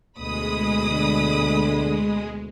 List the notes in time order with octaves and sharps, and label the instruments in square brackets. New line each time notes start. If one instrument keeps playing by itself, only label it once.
[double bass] D2 B2 [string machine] G#3 [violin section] B5 D#6
[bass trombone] D3